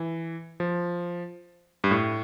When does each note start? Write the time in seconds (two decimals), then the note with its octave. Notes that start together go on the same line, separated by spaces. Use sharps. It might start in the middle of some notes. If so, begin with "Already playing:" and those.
Already playing: E3
0.60 F3
1.84 G2
1.91 A2